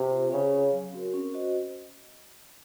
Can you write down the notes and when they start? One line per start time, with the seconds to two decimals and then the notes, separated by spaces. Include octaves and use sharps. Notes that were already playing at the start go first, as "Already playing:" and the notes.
Already playing: C3
0.11 F4 C5
0.32 C#3 C#4
0.53 G#4 C#5 F5
0.72 F#3
0.93 C4 F#4 A#4
1.14 C#4
1.34 F#4 C5 D#5